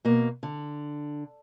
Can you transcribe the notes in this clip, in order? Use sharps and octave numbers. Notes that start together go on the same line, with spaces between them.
B2 A#3
D3